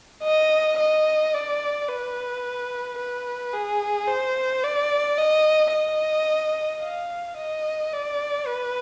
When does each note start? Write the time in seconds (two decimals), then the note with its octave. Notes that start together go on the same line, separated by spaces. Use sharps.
0.24 D#5
0.79 D#5
1.34 D5
1.88 B4
2.98 B4
3.53 G#4
4.07 C5
4.63 D5
5.18 D#5
5.72 D#5
6.82 F5
7.37 D#5
7.92 D5
8.46 B4